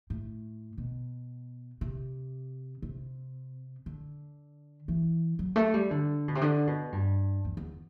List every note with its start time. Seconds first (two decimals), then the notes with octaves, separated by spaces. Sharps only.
0.10 A2
0.78 B2
1.81 C3
2.82 C3
3.86 D3
4.88 E3
5.39 F#3
5.56 A3
5.74 G3
5.91 D3
6.28 B2
6.35 C3
6.41 D3
6.67 B2
6.92 G2
7.45 E2
7.57 E2